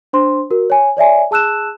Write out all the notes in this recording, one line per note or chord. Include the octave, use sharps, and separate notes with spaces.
D4 C5 C6
F#4 A#4
C#5 G#5
C#5 D5 E5 G#5
G#4 A5 E6 F#6 E7